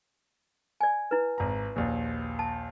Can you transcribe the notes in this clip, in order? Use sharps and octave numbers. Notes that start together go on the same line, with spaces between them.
D5 G#5
E4 B4
G#1 A#5
A#1 D#2
A5